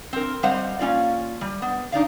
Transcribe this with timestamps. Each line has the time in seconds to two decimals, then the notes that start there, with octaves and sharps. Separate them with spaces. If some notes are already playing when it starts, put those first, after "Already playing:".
0.13 C4 A#4
0.43 G3 G#3 C4 C5 F5 F#5
0.79 A#3 C#4 F4 D5
1.41 G3
1.62 B3
1.92 D4 D#4 D5 F5